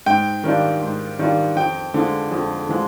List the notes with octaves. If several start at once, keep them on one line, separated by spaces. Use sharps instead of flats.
G#2 G5
D#3 G3 D4 F4
G#2
D#3 G3 D4 F4
F2 G5
D3 F3 G#3
F2
D3 F3 G#3